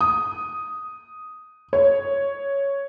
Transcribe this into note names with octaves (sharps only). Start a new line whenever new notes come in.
D#6
C#5